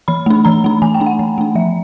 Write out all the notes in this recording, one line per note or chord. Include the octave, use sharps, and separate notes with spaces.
E3 B5
A3 D4
E3 A#5
A3 D4
E3 G#5
G5
A3 D4
F#5
E3
A3 D4
F3 E5